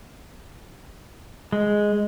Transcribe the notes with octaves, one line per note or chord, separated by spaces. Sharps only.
G#3